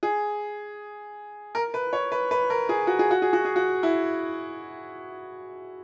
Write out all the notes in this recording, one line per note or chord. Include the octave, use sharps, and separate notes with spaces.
G#4
A#4
B4
C#5
B4
B4
A#4
G#4
F#4
G#4
F#4
G#4
F#4
G#4
F#4
E4